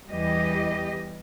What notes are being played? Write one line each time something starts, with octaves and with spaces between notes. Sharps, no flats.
E2 E3 G3 G4 D#5